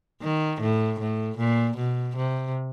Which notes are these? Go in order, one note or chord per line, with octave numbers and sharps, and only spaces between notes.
D#3
A2
A2
A#2
B2
C3